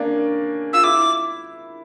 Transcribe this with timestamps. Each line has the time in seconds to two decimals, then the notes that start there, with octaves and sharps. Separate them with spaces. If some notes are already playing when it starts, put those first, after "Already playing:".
Already playing: A#3 C#4 D4
0.73 F4 E6
0.83 E4 D6